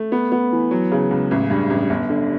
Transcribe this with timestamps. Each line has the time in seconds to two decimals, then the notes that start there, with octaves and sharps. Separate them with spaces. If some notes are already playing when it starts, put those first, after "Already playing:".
Already playing: A3
0.12 B3
0.32 B3
0.52 E3
0.71 F#3
0.92 C#3
1.11 C#2
1.31 A1
1.50 G2
1.70 A1
1.90 G1
2.10 D3